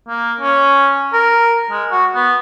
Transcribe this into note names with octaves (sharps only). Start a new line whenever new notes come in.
A#3
C#4
A#4
G#3
F#4
B3